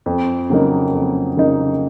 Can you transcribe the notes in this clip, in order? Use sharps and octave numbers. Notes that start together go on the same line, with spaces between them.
F2
C#3 F#3 A#3 D#4
F2
C#3 F#3 A#3 D#4